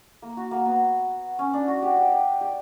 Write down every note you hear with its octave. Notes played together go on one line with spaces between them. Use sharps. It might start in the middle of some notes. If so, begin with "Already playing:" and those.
A#3
F#4
A#3
B3
C#4
D4
F#4
G4
G4
G4
G4